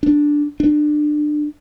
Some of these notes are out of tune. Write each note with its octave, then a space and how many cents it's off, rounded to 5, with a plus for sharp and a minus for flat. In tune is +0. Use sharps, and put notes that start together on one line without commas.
D4 +0
D4 +25